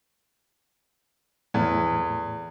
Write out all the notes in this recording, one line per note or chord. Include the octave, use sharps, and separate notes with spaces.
E2 A2